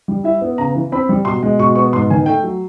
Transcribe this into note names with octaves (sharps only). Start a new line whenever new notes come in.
G3
E4 E5
B3
C#3 A#5
E3
C4 B5
G3
B2 C6
G#3
B2 C#6
B3 C#6
G#2 C6
D#3 G#5
A3 G5
F#3